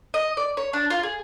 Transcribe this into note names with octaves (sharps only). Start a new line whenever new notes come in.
D#5
D5
C#5
D4
F4
G#4